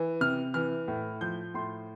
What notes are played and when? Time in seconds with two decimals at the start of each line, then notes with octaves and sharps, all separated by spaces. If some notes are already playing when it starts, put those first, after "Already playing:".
Already playing: E3
0.21 C3 F6
0.54 E3 F6
0.88 A2
1.21 F3 G6
1.54 A2 C6